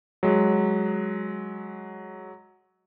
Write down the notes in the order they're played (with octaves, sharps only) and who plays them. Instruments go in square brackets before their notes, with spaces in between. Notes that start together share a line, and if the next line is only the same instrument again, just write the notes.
[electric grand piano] F#3 G#3